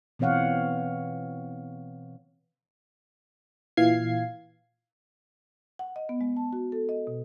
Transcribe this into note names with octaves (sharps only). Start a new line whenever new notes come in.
B2 E3 C4 C#5 F5 F#5
A#2 E3 F5 G#6 C7
F#5
D#5
B3
G#3
A5
F#4
A4
D#5
B2